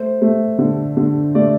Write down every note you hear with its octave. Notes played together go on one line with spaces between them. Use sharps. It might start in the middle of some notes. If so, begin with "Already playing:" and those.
Already playing: A3 C5
A3
D3
D3
A3 D5